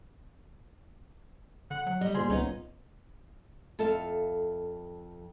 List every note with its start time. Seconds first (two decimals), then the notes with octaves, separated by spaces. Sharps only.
1.71 D3 F#5
1.87 F#3
2.01 G3 D#5
2.15 A#2 D3 G#4 C5 C6
2.30 C#2 B3 C#4 D#4
3.79 F2 A4 E5 F5